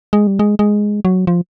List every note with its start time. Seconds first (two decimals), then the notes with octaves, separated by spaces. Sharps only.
0.13 G#3
0.27 G3
0.39 G#3
0.59 G#3
1.05 F#3
1.27 F3